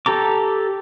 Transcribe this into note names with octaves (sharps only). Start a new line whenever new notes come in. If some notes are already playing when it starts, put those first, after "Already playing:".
G4 A4 A#5 D6